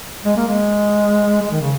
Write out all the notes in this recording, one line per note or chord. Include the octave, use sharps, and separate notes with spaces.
G#3
A#3
G#3
G#3
D#3
C#3